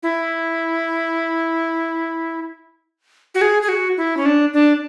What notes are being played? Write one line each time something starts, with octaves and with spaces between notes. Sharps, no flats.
E4
F#4
G#4
G#4
F#4
E4
C#4
D4
D4